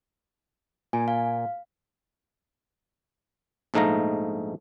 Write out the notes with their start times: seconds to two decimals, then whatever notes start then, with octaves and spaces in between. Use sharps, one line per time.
0.93 A#2 G#5
1.08 F5
3.74 A#1 G#2 A3 D#4 F5 A#5